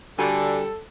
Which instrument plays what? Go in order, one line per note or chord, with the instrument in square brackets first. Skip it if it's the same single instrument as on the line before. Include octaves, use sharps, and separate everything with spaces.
[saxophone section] D3 [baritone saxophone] G3 [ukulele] F#4 G#5 [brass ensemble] A4